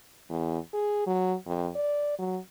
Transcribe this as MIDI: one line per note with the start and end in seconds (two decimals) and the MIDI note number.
0.29 0.58 40
0.73 1.04 68
1.06 1.34 54
1.46 1.69 41
1.75 2.15 74
2.18 2.38 54